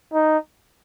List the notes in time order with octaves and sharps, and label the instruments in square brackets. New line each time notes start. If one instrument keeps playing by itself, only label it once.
[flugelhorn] D#4